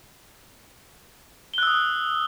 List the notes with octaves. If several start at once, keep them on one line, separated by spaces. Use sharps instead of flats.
D#6 E6 F#6 G7